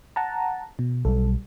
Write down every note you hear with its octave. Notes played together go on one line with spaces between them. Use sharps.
F#5 A5 A#5
B2
B1 F#3 G3 A4